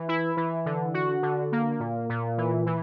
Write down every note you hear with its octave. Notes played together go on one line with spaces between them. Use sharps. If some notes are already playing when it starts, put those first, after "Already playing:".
Already playing: E3
E4
E3
D3
F#4
D3
A#3
A#2
A#2
E3
E3